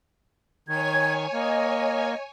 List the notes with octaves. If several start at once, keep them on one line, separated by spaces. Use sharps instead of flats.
D#3 C#5 G#5 G#6
A#3 D#5